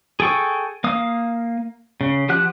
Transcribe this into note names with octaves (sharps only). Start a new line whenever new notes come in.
G#4 A4 G5 C#6
A#3 F5 D#6
C#3
F3 G4 F#5 F#6